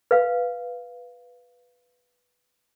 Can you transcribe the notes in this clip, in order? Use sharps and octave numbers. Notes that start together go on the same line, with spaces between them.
B4 F5